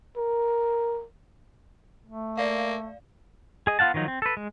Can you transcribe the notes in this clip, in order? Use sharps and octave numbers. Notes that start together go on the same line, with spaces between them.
A#4
A3
A#3 D5 F5
G#4 D#5
B3 F4 F5 F#5 A5
D#3 F3 F#3 D#4
C4
A4 B4
G#3